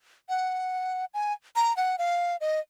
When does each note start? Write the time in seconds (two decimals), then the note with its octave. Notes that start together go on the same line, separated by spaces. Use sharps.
0.29 F#5
1.14 G#5
1.56 A#5
1.77 F#5
1.98 F5
2.41 D#5